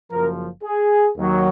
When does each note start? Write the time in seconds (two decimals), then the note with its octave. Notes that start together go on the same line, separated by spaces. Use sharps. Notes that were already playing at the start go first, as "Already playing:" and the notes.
0.11 F#1 F#2 F3 A#4
0.63 G#4
1.16 D#2 D#3 F#3